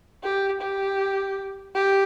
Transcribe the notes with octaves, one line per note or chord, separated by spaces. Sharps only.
G4
G4
G4